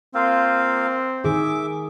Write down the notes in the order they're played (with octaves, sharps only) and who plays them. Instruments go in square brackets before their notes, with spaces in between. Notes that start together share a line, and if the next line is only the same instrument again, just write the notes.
[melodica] A#3 F4 F5 [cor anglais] C4
[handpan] D#3 G#4 [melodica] E5 D6